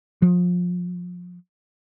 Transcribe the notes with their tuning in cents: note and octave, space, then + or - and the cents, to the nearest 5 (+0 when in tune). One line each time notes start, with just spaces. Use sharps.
F3 +30